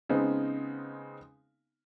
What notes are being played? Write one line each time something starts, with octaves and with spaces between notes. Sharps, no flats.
C#3 G#3 B3 C4 D#4